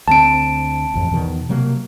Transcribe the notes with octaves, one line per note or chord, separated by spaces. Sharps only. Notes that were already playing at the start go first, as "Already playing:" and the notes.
D2 D3 C4 A5 D7
A1 F2
E2 B2 D#3
C3 F#3 A#3